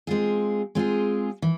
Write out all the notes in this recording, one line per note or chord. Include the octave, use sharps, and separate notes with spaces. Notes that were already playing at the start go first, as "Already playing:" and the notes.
G#3 C4 F4 G#4
G#3 C4 F4 G#4
E3